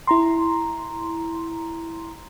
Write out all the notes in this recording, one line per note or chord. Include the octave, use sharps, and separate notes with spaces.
E4 A#5 C6